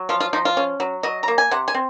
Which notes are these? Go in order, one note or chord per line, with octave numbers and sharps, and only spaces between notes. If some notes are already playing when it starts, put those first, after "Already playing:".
Already playing: F#3
F3 F4
F4
F3 D#4
F4
C#4
F#3
F#3 D#5
A#3 A#5
G#5
C3 F#5
G#5
C4